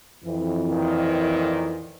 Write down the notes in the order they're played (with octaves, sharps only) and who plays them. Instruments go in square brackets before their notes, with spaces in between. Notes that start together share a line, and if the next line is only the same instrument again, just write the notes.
[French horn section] F2 E3
[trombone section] A#2 D#3